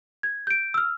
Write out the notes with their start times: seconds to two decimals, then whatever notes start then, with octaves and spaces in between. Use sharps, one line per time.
0.23 G#6
0.47 G6 D7
0.74 E6 F6